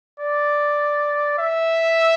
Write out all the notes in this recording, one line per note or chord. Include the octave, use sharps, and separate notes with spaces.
D5
E5